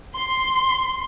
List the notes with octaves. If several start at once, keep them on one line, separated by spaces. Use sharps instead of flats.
C6